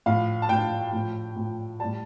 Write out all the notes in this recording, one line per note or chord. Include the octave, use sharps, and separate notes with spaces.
A2 F3 F5
A5
A2 F3 G5
A2 F3
A2 F3
A2 G3 A5